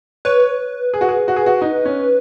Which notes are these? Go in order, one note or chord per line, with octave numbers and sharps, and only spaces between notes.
B4 C#5
G#4
F#4
G#4
F#4
G#4
F#4
D#4
C#4